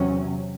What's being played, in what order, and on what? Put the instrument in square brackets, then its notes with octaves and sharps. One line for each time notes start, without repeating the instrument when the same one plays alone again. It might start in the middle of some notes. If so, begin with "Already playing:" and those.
Already playing: [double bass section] E2 C3 F#3 C#4